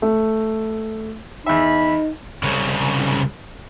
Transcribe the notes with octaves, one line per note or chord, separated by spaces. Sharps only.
A3
E2 D#4 E5 B5
C2 C#3